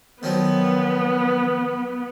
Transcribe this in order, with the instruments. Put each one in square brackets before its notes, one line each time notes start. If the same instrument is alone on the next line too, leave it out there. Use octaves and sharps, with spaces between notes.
[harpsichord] D#3 F3 F#3 [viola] B3